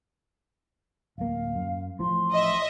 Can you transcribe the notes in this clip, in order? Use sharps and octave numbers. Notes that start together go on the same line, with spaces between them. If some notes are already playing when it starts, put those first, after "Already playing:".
D1 A#3 F5
F#2
A1 A2 F3 C6
D#5 E5